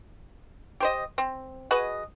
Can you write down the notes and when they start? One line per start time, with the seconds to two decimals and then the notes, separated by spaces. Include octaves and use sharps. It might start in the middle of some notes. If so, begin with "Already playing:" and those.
0.80 G4 C5 D#5
1.18 C4
1.71 F#4 G#4 B4 D#5